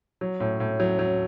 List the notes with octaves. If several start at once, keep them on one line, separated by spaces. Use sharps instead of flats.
F#3
A2
A2
F#3
F#3